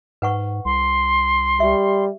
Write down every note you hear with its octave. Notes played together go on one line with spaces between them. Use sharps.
G#2 B4 F#5 C#6
C2 C6
G3 G4 E5